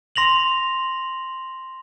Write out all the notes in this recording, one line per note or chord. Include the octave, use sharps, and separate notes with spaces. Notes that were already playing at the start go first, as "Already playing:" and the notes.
C6 A#6 F7 F#7